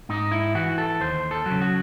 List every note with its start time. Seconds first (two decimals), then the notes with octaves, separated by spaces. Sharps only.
0.09 G#2 D#4
0.32 E4
0.55 E3 F#4
0.78 A4
1.00 D#2 C5
1.31 A4
1.46 F#3
1.51 C#3
1.61 F#4